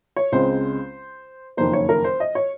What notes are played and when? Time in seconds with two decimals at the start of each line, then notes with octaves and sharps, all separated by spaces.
0.16 C#5
0.32 C#2 C#3 G#3 C4 C5
1.57 F#1 F2 D#3 A#3 C5
1.73 C#5
1.89 A#4
2.04 C5
2.20 D#5
2.35 C#5